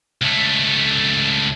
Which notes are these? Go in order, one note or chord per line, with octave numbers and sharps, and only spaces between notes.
C#2 A3